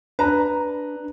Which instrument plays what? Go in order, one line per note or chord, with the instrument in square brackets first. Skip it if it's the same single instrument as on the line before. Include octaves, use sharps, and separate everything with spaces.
[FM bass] D4 [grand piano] B4 A#5